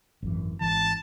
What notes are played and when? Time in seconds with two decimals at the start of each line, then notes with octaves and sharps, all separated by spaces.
0.23 G#1 F#2 E3
0.61 G#1 E3 A5